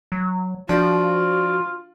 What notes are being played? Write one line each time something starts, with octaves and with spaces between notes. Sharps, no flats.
F#3
F3 D4 F4 F#4